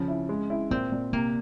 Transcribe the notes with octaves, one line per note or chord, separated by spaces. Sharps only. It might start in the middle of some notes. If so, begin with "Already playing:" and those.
Already playing: C#3 F3 C#4
E4
G#3
E4
A#2 C4
A#2
C3 A#3